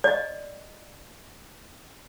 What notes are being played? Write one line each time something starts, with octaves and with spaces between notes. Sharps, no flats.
D5 D#5